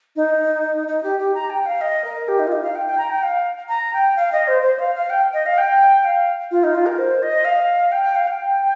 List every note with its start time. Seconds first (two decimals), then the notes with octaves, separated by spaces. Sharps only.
0.16 D#4
0.87 D#4
1.03 G4
1.19 G4
1.34 A#5
1.50 G5
1.66 F5
1.81 D#5
2.04 A#4
2.28 G4
2.39 D#4
2.47 F4
2.52 D#4
2.63 F5
2.75 G5
2.87 G5
2.98 A#5
3.10 G5
3.23 F5
3.69 A#5
3.93 G5
4.16 F5
4.33 D#5
4.48 C5
4.63 C5
4.79 F5
4.95 F5
5.10 G5
5.34 D#5
5.46 F5
5.58 G5
6.05 F5
6.51 F4
6.64 D#4
6.75 F4
6.86 A#4
6.98 C5
7.22 D#5
7.45 F5
7.92 G5
8.04 G5
8.15 F5
8.27 G5